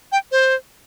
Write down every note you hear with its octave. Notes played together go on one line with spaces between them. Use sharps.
G5
C5